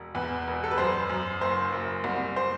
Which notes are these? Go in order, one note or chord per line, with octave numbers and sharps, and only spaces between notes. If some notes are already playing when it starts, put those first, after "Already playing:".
Already playing: E1
E2 B4
E1
A4
B4
F#2 C5
F#2
F#1 C5
F#1
C2
C5